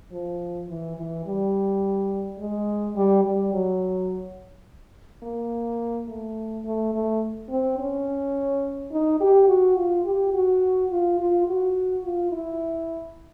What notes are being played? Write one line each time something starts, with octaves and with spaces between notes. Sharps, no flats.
F3
E3
E3
G3
G#3
G3
G3
F#3
A#3
A3
A3
A3
C4
C#4
D#4
G4
F#4
F4
G4
F#4
F4
F4
F#4
F4
E4